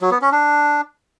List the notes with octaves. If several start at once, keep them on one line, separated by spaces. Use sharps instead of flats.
F#3
B3
C#4
D4